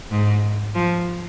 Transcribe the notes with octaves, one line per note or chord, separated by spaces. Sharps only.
G#2
F3